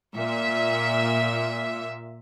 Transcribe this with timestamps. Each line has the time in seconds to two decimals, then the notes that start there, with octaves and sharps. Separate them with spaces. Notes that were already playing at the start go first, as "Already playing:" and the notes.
0.14 A#2 E5